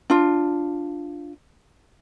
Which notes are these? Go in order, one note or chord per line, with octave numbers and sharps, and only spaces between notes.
D4 F4